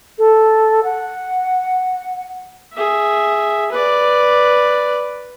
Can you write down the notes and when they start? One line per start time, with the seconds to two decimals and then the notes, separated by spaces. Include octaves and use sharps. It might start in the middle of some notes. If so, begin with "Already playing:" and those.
0.18 A4
0.83 F#5
2.73 G#4 E5
3.72 B4 D5